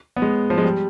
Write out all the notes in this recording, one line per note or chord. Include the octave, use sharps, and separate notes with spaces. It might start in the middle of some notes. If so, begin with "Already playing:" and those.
B3
G#3
F3
G#3
G3